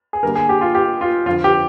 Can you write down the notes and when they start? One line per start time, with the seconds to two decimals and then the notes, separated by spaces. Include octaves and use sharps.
0.13 G#4
0.23 D3 G3 A#3 A#4
0.36 G#4
0.49 G4
0.61 F4
0.75 G4
1.01 F4
1.26 F2 D3 F3 F4
1.44 G4